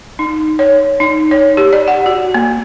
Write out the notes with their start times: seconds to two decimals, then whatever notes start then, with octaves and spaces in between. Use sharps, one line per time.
0.19 D#4
0.59 C#5
1.00 D#4
1.31 C#5
1.57 G4
1.73 D5
1.88 F#5
2.06 F#4
2.34 A#3